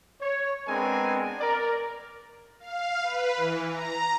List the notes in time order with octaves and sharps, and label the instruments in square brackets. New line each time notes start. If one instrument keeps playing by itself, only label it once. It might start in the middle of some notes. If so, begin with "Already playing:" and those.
[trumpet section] C#5
G#3 B3 C4 D4 A#4 G#5
A#4 D5
[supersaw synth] F5
B4
E3
A#5